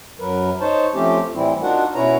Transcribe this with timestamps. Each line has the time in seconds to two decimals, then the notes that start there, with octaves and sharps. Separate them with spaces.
0.19 F#2 F#3 A#4 B4
0.60 D#4 C5 C#5 A5
0.94 F3 A3 C4 C#4 G4
1.34 A2 E3 G3 C4 E4
1.62 D4 D#4 F4 F#4 A#4 F#5
1.95 B2 C#4 E4 B4 C#5 A#5